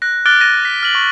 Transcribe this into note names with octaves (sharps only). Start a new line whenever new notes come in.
F#6 A#6
D6 F6 F#6 A6 D7 G7
A6 A#6 D#7
B6
F6 F#7
C#6